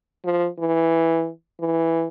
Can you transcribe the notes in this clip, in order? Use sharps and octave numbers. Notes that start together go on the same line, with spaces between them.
F3
E3
E3